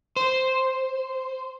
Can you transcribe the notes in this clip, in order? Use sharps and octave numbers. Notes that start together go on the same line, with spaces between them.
C5